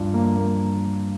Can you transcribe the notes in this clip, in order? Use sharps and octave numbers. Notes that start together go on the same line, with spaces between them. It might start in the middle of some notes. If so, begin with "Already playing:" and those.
Already playing: G2 F3 F4
A#3
A#3